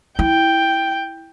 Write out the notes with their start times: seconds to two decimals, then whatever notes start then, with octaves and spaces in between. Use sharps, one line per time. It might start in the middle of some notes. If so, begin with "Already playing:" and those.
0.19 E4 G5